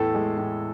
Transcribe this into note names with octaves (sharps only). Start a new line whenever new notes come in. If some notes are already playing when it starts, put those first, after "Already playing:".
Already playing: E2 A2 A4
G#3
A2